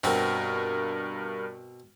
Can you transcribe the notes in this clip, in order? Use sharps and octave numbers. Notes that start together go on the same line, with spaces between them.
G2 B2 C4 F#4 A#4